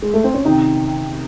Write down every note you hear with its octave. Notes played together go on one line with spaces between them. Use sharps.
G#3
A3
C4
C#4
C3 D#3 D#4